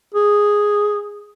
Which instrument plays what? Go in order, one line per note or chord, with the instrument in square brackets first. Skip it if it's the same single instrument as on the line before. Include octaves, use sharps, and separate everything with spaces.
[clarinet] G#4